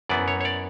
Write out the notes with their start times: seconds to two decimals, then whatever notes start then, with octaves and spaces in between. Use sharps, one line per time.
0.09 F#2 E3 B3 D5
0.28 C#5
0.41 C#5
0.45 D5